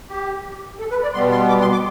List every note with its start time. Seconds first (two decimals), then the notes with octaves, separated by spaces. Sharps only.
0.09 G4
0.80 A4
0.91 B4
1.03 D5
1.14 B2 G3 B3 C6
1.32 C6
1.49 D6
1.61 C6
1.72 D6